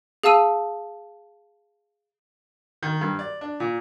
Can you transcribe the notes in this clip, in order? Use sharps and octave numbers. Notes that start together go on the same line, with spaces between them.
G#4 F5 A5 E6 D#7
D#3
G2
D5
D4
A#2